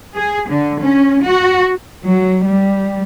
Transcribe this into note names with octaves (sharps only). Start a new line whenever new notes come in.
G#4
D3
C#4
F#4
F#3
G3